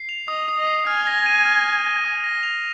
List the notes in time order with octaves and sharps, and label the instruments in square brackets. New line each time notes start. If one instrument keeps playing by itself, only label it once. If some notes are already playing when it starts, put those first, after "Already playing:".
Already playing: [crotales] C7
F7
[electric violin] D#5 [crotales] D#6
[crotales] D#6
[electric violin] D#5
[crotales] C7
[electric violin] G#5 [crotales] F6
[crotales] A#6
D#7
F6
F6
A#6
D#6
A#6
F7